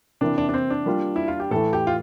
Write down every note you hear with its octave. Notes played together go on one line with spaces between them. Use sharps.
C3 E3 A#3 D4 E4
D4
D4
C4
D4
G3 A#3 F4
E4
F4
G4
A2 E3 A3 A4
G4
F4